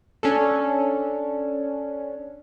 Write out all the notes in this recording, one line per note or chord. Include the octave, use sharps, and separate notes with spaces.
C#4 D4 A4